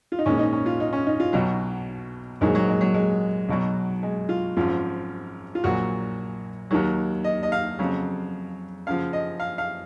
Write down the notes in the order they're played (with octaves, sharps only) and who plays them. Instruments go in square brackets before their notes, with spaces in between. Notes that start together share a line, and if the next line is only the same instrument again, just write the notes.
[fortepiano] F4
D#4
A#1 G#2 D#3 C#4
D#4
C#4
F4
D#4
C#4
D#4
F4
B1 B2 F#3
A#1 G#2 D#3 F#3 G#3
F#3
G#3
F#3
G#3
B1 B2 F#3
G#3
F4
G#1 F#2 F3 F4
F4
A#1 A#2 F#3 F#4
D#2 D#3 F#3
D#5
D#5
F5
F2 C#3 F#3
F#2 C#3 F3 F5
D#5
F5
F5